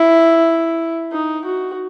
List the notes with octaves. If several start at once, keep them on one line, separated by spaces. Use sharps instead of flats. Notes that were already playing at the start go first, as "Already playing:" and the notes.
Already playing: E4
D#4
F#4